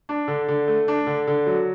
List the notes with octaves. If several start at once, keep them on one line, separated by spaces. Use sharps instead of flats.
D4
D3
D3
A3
D4
D3
D3
F#3